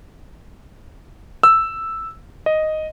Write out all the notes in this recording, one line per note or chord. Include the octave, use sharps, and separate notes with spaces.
E6
D#5